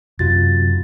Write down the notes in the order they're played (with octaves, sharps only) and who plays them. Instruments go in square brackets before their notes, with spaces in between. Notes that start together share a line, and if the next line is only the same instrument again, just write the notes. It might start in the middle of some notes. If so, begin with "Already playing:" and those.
[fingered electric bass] F#2 C3 [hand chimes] F4 F#4 A6